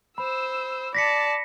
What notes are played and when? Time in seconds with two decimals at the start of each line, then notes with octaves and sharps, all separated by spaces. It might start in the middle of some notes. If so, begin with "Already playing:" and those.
0.18 C5 B5 E6
0.95 D5 A5 A#6 B6 C#7